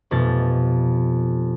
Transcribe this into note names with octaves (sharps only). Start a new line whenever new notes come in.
F1 F2 B2 A6